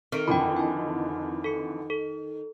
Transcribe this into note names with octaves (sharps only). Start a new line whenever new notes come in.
D#3 C4 A4 D7
F2 D3 E3 G5 B5
G#5 A5
A4 C#7
A4